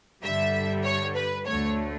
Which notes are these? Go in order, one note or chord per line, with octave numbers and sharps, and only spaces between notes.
G2 D3 G3 E5
C#5
B4
D2 D3 A3 C#5